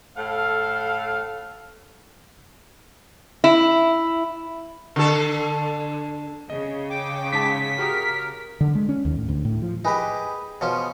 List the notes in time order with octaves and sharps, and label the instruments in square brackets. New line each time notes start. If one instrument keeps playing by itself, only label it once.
[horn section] A2 A4 F5
[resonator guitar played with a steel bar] E4
[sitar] D3 A4
[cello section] C#3 [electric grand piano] D#5
[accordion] G5 D6
[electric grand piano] G#2 A5 [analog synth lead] B6
[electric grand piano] F#4 G4 D#6 [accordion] A#4
[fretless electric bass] D3
G#3
C#4
D#2
A2
D2
A2
F3
[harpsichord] D#4 G4 [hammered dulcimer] G#4 B4
[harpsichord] B2 F3 C#4